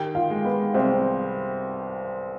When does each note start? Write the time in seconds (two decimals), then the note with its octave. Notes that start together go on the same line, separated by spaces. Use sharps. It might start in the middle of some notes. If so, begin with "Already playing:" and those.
Already playing: D#3 G4 G5
0.15 F4 F5
0.30 G#3
0.45 B3 B4
0.74 C2 C4 C5